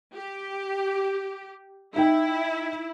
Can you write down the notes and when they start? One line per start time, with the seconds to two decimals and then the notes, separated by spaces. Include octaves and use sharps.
0.15 G4
1.96 D#4 E4 G5